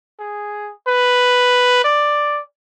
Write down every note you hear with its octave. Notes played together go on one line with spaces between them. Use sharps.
G#4
B4
D5